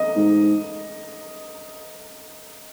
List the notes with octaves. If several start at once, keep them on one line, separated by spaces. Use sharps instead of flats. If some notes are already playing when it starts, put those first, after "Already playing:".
Already playing: D#5 D#6
G#2